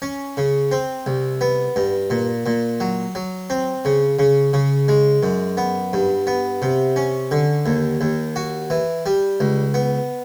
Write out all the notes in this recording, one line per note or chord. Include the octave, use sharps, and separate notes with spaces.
C#4
C#3
C4
C2
B3
G2
A#2
A#2
F#3
F#3
C4
C#3
C#3
C#3
G#3
F#2
B3
G2
B3
C3
C#4
D3
D#2
D#2
F#4
E3
G3
C#2
B3